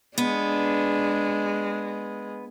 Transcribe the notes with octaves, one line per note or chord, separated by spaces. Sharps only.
G#3 B3 D4